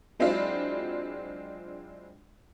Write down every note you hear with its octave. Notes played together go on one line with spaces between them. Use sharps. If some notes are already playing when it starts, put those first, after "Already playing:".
F#3 G#3 C4 D4 E4 F4